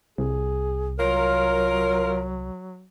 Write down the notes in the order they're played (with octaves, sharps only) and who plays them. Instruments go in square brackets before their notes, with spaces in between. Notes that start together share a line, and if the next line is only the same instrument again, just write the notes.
[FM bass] C2 [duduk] G#4
[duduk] F#3 [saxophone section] F4 A#4 [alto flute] C#5